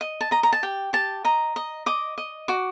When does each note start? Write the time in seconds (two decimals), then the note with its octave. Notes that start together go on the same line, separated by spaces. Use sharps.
0.01 D#5
0.21 A5
0.31 D#5 A#5
0.43 A#5
0.53 A5
0.63 G4 G5
0.93 G4 A5
1.25 D#5 A#5
1.56 D#5
1.86 D#5 D6
2.18 D#5
2.48 F#4 D6